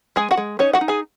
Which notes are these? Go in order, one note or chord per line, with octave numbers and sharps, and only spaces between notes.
G#3 G#4 G#5
F#4 F#5
G#3
C#4 D#4 C#5
F#4 F#5
D#4
G#4 G#5